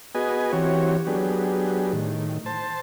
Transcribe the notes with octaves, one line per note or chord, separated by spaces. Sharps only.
B3 F#4 G#4 B4 D#5 G#5
E3 C4 F#4 G4 C#5
F#3 B3 D4 G4 G#4
A2 D#3
C5 A5